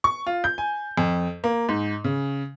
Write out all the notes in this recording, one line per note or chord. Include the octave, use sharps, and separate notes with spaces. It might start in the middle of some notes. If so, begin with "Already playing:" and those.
C#6
F4
G6
G#5
F2
A#3
G#2
C#3